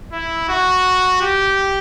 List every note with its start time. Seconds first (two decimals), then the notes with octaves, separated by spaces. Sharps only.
0.13 E4
0.49 F#4
1.21 G4